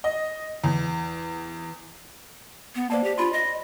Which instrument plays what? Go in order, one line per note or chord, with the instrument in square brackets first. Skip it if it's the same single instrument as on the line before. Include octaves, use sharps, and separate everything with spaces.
[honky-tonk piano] D#5
E2
[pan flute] B3
[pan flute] A#3 [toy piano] C5 D5 A5
[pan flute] G4
[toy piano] D4 B5 C6 [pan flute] F4
[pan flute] D#5